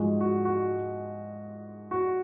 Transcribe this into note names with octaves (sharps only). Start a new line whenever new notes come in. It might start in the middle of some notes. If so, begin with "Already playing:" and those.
Already playing: G#2 F3 G#3 F#4
F#4
F#4
F#4